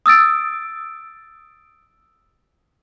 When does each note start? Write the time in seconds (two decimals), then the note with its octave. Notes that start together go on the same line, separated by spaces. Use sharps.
0.06 D#6 E6 A6 D7